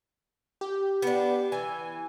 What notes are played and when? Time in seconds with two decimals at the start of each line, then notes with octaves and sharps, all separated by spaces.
0.61 G4
1.02 B3 D4
1.52 E3 G#5